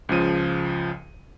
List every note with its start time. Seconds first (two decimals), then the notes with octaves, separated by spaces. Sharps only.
0.09 C#2 C#3 F3 D#7